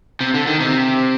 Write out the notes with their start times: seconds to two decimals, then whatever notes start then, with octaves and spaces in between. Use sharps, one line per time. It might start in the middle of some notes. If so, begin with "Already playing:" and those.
0.20 C3
0.34 D3
0.47 D#3
0.60 C3